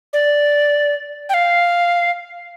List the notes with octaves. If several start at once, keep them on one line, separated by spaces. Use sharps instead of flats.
D5
G5
F5